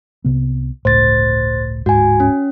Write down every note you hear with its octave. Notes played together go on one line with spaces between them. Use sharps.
C2 C3 B3
G1 C#2 A2 C5 A6
D1 G#2 F#4 G#5
C#4